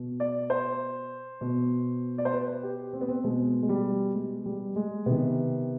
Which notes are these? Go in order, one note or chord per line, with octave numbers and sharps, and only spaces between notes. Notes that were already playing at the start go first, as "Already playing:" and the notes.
Already playing: B2
D5
C5
B2
D5
C5
B4
G4
C4
B3
C4
B2 G#3
G#3
G3
G#3
G3
G#3
C3 D#3 B3